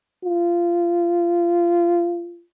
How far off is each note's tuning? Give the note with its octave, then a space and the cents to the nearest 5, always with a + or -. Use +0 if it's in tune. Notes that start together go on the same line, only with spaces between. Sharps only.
F4 -20